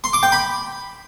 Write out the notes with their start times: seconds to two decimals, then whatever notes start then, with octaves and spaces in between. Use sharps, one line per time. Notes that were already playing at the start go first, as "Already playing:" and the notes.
0.04 C6
0.13 D6
0.23 G5
0.32 B5